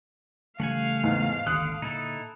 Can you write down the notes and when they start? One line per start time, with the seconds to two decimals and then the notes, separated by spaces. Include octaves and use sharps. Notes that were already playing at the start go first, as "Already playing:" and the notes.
0.60 C#3 E3 G3 A3 F5 F#5 G#5
1.03 E2 G#2
1.47 G#1 D#2 D3 D#6 F#6
1.82 A#2 D3 D#4 E4 A4